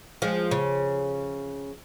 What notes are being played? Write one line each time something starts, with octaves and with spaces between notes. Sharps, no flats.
F3 G#3
C#3